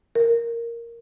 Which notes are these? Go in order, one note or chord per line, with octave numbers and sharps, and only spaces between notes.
A#4